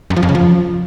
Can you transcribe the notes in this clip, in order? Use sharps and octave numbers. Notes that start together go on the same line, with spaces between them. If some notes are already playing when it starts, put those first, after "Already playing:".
F#2
F3
F2
C#3
F3